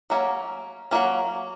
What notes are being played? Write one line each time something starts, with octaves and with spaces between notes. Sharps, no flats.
F#3 A#3 C#4
F#3 A#3 C#4